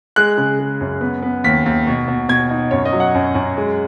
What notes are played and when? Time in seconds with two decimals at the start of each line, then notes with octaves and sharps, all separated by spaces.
0.16 G#3 F#6
0.37 C#3
0.59 G#3
0.81 F#2
1.01 B3
1.23 B3
1.44 D#2 B6
1.66 D#2
1.87 B2
2.08 B2
2.29 B2 G#6
2.51 D#4
2.71 F#2 C#5
2.85 D#5
2.93 F#3
3.00 F#5
3.15 F#2
3.35 F#2
3.57 G#3